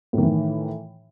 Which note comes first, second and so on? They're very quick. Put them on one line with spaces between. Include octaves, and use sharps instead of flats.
A2 D#3 E3